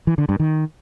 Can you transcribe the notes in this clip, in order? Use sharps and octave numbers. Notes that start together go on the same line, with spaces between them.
E3
D3
G2
D#3